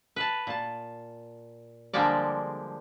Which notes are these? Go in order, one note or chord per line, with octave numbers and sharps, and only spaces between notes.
B4 A5
A#2 A5
D3 F3 G3 G#3 A#3 D5